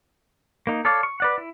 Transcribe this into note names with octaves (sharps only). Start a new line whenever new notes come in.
A#3 D#4
A4 C#5 D5 F5
C#6
B4 D5 F#5
E4